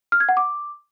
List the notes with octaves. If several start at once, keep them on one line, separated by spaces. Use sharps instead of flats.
F6
G#6
F#5
D6